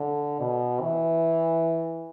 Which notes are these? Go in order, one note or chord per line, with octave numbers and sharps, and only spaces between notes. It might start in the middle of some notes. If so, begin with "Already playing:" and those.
Already playing: D3
B2
E3